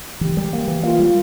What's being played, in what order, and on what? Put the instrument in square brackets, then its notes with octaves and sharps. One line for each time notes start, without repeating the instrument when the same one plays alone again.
[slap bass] E3 [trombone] G4
[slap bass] G3
A#3
E3
[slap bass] A#3 [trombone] F4
[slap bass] G3